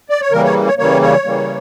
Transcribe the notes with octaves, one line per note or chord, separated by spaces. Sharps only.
D5
C#5
C#3 E3 G3 A#3 A#4
C#5
C#5
C#3 E3 G3 A#3 C#5
C#5
C#3 E3 G3 A#3